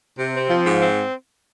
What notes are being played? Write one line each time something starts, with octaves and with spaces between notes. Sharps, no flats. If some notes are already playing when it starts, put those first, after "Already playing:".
C3
C4
F3
G#2
C4